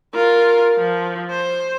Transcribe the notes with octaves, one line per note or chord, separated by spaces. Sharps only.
F4 A#4
F3
C5